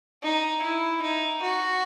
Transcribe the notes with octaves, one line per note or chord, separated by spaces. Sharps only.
D#4
E4
D#4
F#4